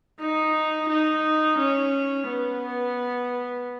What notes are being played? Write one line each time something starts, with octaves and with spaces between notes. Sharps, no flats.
D#4
D#4
C#4
B3